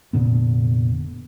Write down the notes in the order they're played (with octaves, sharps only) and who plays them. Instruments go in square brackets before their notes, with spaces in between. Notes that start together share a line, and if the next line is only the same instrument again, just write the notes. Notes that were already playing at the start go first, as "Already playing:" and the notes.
[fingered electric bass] F1 A#2 D3 B3